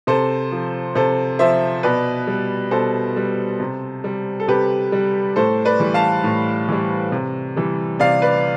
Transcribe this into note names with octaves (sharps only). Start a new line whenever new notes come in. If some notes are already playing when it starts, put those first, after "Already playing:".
C3 A4 C5
F3
C3 A4 C5
F3 C5 E5
B2 B4 D5
G3
B2 A4 C5
G3
C3
G3
A4
C3 G4 B4
G3
A2 A4 C5
B4 D5
E3 G3
F5 A5
A2
E3 G3
C3
E3 G3
C3 D5 F5
B4 D5